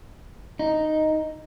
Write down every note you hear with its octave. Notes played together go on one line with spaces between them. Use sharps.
D#4